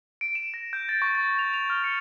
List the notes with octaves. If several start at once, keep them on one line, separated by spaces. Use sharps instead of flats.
D7
E7
A#6
G6
A6
C#6
A6
F7
F7
F6
C#7